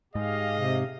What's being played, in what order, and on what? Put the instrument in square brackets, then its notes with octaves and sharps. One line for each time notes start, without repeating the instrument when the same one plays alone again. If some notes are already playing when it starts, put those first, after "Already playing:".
[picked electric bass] G#2 [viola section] G4 G#4 F5 [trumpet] D#5
[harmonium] C3